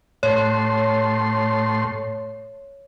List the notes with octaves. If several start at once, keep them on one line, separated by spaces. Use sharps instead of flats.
A2 C#5 C6